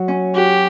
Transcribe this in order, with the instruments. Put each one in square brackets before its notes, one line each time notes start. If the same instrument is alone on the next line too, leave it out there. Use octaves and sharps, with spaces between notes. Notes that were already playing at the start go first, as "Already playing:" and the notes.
Already playing: [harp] F#3
C#4
[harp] F#4 [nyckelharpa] G4